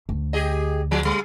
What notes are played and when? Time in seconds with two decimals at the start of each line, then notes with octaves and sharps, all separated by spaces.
0.09 D2
0.33 G4 G#4 D#5
0.91 F3 G#3
1.05 G3